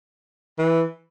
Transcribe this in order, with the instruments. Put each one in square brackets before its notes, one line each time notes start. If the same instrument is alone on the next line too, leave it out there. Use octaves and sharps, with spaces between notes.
[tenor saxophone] E3